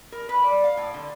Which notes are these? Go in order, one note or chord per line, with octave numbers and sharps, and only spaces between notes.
A#4
B4
D5
F5
A2
D3